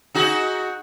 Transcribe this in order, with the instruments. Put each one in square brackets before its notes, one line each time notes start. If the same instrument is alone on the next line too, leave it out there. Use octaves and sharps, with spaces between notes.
[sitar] D#4 F#4 G#4